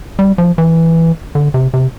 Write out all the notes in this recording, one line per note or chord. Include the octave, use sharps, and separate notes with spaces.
G3
F3
E3
D3
C3
C3